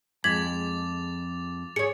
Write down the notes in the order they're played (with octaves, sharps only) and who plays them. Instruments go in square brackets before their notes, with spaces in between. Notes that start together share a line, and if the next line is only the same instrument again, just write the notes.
[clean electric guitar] F2 [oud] G#3 [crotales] D6 A6 F7 [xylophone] G#6 B6 F#7
[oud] G#4 C#5 [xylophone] C#7